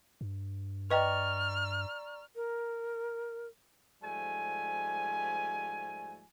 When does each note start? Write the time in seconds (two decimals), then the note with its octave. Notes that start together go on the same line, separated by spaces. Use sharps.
0.21 G2
0.90 B4 D5 D#5 G5 A#5 C#6 F6
2.35 A#4
4.02 G#2 F3 G3 A3 G#5